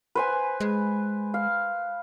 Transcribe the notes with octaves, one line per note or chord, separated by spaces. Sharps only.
B4 C5 G#5
G#3
F5